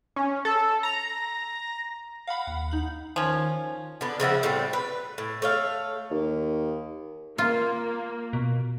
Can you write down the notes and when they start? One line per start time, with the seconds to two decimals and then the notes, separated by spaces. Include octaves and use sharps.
0.16 C#4
0.45 A4
0.83 A#5
2.27 F5 F#5 B5
2.47 D#2 F#5
2.71 D#4 F#7
3.16 D#3 F3 C#4
4.01 D3 B3
4.20 C#3 F3 E4 F#5
4.43 A2 G3 C4
4.73 B4
5.18 A2
5.42 A3 C#5 F5
6.11 D#2
7.38 A#3 F4
8.33 B2